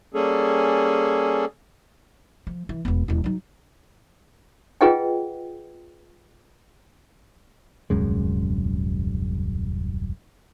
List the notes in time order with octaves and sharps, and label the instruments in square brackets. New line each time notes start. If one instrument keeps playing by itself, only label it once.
[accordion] G3 A#3 C#4 G#4 A4
[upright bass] F3
E3
E1 B3
D#1 E4
F#3 D#4
[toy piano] F4 G#4 B4 D#5 F#5 G5
[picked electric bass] D#1 C2 F#2 G#3